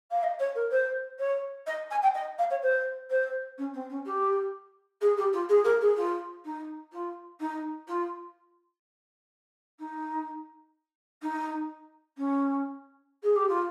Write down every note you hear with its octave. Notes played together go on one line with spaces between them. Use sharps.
F5
D#5
C#5
A#4
C5
C#5
D#5
G#5
G5
D#5
F5
C#5
C5
C5
C#4
C4
C#4
G4
G#4
G4
F4
G#4
A#4
G#4
F4
D#4
F4
D#4
F4
D#4
D#4
C#4
G#4
G4
F4